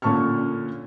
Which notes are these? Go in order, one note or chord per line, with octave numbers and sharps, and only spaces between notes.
A#2 D3 C#4 A5 C#6 F6